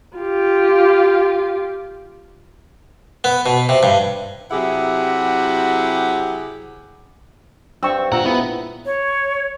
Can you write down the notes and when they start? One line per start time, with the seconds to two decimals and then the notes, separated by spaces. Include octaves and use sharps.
0.17 F4 G4
3.24 B3
3.46 B2
3.69 C3
3.83 G2
4.51 C3 F#3 E4 G4 G#4 F#5
7.83 G2 C4 C#6 E6
8.12 D2 A#2 F4 F#5 A#5 E6
8.25 B3 E4 G#4
8.86 C#5